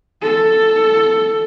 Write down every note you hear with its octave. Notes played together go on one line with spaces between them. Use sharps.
A4